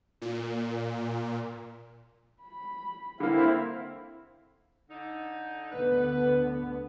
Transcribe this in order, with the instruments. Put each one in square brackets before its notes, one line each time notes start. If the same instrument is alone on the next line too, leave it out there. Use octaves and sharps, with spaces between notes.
[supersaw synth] A#2
[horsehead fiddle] B5
[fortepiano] D3 A#3 [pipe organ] C4 E4 [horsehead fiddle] F5
[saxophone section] D3 D#4
[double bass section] D2 D3 B3 [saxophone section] B4